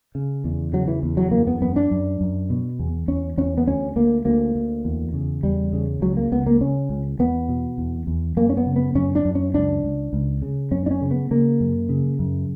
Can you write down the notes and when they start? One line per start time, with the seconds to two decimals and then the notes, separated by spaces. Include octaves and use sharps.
0.15 C#3
0.44 E2
0.73 C#3 F#3
0.88 E3
1.03 E2
1.17 F#3
1.31 F#2 A#3
1.47 B3
1.61 F#2 B3
1.76 D4
1.91 F#2
2.21 F#2
2.50 B2
2.79 E2
3.08 E2 C#4
3.37 E2 C#4
3.58 B3
3.67 D2 C#4
3.96 D2 A#3
4.25 D2 A#3
4.55 D2
4.85 E2
5.14 C#3
5.43 E2 G3
5.73 C#3
6.01 C#2 F#3
6.17 A#3
6.32 C#2 B3
6.46 A#3
6.61 C#3 C#4
6.89 C#2
7.19 E2 B3
7.49 B2
7.78 E2
8.07 E2
8.37 F#2 A#3
8.49 C#4
8.57 B3
8.66 C#3
8.76 B3
8.95 F#2 C#4
9.15 D4
9.25 F#2
9.35 C#4
9.54 C#2 D4
9.83 C#2
10.13 C#2
10.42 C#3
10.71 F#2 C#4
10.86 D4
10.91 C#4
11.01 C#3
11.11 B3
11.31 C#3 A#3
11.60 F#2
11.89 C#3
12.19 F#2